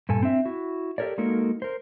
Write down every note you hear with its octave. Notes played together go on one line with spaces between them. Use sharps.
G2 A#2 A4 G#5
C4 D4 E5
E4 F#4
G4 A4 A#4 C#5 D5
G#3 A#3 D#4 F#4 A4 A#4
A#4 C5